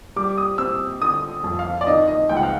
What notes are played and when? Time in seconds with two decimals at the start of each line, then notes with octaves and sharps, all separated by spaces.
0.16 G3 D6
0.38 D#6
0.58 C4 E6
1.01 D3 D#6
1.44 F2
1.59 F5
1.81 D5
1.87 D#3 D#5
2.08 D#5
2.29 C#2 G5
2.37 F#5
2.43 F5